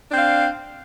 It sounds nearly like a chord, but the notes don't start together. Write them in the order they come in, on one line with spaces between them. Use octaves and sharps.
D4 C4 F5